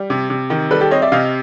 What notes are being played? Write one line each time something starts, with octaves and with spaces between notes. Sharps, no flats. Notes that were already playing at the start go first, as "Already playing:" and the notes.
Already playing: G3
C3
C3
D#3
G3 A4 B4
G4 A4
C4 C#5 D#5
D5 E5
C3 D#5 F5